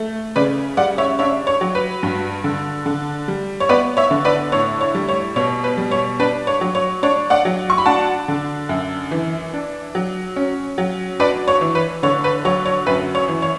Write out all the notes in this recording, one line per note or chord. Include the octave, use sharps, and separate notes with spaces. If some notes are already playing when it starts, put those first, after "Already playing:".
Already playing: A3
C#3 B4 D5
G3 D5 F#5
C#5 E5
D4 C#5 E5
C#5
F#3
B4
G2
D3
D3
G3
C#5
B3 B4 D5
C#5 E5
D3
B4 D5
A2 C#5
C#5
G3
C#5
B2 C#5
B4
G3
C#5
D4 B4
C#5
F#3
C#5
D4 C#5
D5 F#5
F#3
C#6
B5
D4 F#5 A5
D3
F#2
E3
D4
F#3
C#4
F#3
D4 B4 D5
C#5
E3
B4
D3 C#5
B4
F#3 C#5
C#5
F#2 B4
C#5
E3
C#5